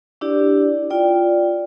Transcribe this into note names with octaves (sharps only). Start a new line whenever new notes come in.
D4 E4 G4 D5
F4 D5 G5